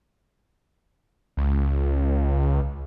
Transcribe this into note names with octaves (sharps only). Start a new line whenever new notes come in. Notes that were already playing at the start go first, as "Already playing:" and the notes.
C#2